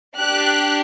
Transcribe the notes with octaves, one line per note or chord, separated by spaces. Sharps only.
D4 G4 F#6